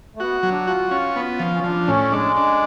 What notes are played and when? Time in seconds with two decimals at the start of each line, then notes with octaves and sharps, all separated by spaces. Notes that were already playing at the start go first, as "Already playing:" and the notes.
0.16 A3
0.20 B3 F#4
0.43 F#3
0.51 D4
0.67 F4 F#4
0.91 C#4
1.16 B3
1.40 F3
1.55 C#4
1.64 F3 D4
1.88 A2 C#4
2.11 G#3 D4
2.36 D4